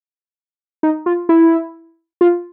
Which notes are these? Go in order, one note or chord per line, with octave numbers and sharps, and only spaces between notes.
D#4
F4
E4
F4